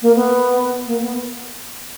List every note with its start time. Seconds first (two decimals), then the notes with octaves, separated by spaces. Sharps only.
0.02 A#3
0.16 B3
0.87 A#3
1.01 B3